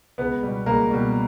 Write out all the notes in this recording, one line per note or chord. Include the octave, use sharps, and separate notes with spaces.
C#2 B3 B4
B2 G3
C#2 A#3 A#4
B2 G3